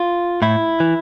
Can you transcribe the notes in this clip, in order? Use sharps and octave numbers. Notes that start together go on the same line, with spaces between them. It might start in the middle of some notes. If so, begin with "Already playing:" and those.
Already playing: F4
A2 E4
E3